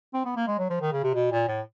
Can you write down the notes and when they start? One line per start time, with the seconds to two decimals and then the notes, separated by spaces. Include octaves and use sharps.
0.14 C4
0.25 B3
0.36 A#3
0.47 G#3
0.59 F#3
0.70 F3
0.81 D#3
0.92 C#3
1.04 C3
1.14 B2
1.32 A#2
1.48 A2